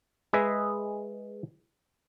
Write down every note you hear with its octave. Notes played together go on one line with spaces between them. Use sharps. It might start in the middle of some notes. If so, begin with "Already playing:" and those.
G#3 G#4 B4 D#5 E5